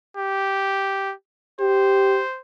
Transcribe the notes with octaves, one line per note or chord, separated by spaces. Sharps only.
G4
G4 C5